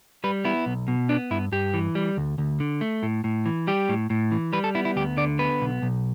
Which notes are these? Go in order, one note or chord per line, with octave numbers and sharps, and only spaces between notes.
G3 B4
B3 E4
B1
B2
B3 D4
G2 E4
G2 G4
E3
G3
D2
D2
D3
A3
A2
A2
E3
G3 G4
A2
A2
E3
G3 B4
A4
B3 E4
E4
D2 G4
D3 D5
B3 B4
B1
B1